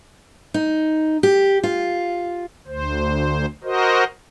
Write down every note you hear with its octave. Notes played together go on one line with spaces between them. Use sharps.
D#4
G4
F4
D2 C5
F#4 A#4 C5 D#5